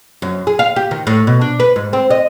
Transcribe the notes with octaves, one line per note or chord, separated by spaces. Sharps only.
F#2
G#4
F5
G4
D#3
A2
B2
D4
B4
G#2
C4
D#5